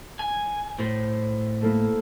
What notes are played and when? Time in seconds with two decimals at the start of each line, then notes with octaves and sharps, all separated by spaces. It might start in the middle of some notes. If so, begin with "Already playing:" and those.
0.19 G#5
0.79 A2 C5
1.61 A3 A#3 E4